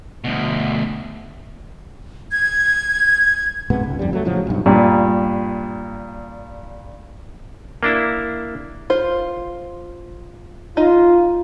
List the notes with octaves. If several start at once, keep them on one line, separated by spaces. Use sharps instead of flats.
D2 B2
G#6
C#2 G#2 C3 B3
C#2
F2 G#2 G3
F#3 A3
A2 C#3 F3 F#3
B1 G2
G2 A#2
A#3 D4 E4
F4 C5
D#4 F4 D#5